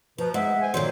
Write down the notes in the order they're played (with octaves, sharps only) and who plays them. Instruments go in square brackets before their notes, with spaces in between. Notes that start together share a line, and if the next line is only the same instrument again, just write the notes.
[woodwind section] B2 F3 [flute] B4 [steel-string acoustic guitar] A#5
[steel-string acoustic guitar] G#3 [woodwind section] D#4 G#4 E5 [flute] F#5
[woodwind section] C5 G#5
[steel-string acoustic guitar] A#2 D#3 F#3 [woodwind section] C5 [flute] C6